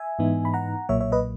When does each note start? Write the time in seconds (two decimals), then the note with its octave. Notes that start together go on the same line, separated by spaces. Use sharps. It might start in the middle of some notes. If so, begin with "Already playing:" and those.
Already playing: E5 G#5
0.19 G#2 E3 B3 D#4
0.45 B5
0.54 F#5 A#5
0.89 B1 A#2 F#3 A#3 C#5 E5
1.01 C#5 E5
1.12 B4 D#5